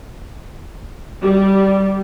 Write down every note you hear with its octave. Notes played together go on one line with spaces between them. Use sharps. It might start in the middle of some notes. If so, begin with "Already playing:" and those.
G3